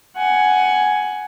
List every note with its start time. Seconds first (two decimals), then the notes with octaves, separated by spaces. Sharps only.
0.16 F#5 G#5